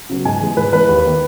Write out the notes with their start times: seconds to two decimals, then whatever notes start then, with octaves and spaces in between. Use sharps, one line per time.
0.10 C#3 F#3 B3
0.25 G#2 G#5
0.41 E3 G#3
0.57 G#2 B4
0.73 E3 G#3 B4
0.89 D#2
1.05 D#3 A#3